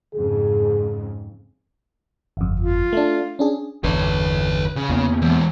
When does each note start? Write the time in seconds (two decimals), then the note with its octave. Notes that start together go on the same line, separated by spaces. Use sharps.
0.14 F2 G#2 C#3 G#4
2.37 G1 F2
2.60 F4
2.93 A3 D4
3.39 C#4 D4 G#4
3.84 G1 E2 D3 B4 C#5
4.76 C#3
4.89 E2 A#3 B3
5.22 E3 G#3